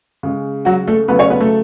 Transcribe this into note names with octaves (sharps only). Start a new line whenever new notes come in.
C#3 G#3
F#3 F#4
A3 A4
C#3 F#3 A3 B3 B4
C#4 C#5
B3 B4
A3 A4